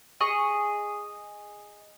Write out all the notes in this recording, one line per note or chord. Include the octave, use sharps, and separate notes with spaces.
G#4 D#5 C#6